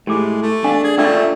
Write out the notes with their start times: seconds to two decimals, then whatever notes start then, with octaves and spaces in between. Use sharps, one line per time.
0.07 A2 G#3 G4 D6
0.42 A3
0.64 D4 D#5 F5 G#5
0.84 G#4 D5
0.98 A3 C#4 D4 F4 D5 E5 C#6